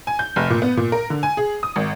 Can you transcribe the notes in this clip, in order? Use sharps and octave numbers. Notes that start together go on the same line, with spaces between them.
G#5
G6
F1
A#2
B3
A#2
A#4
D3
G#5
G#4
D#6
G#1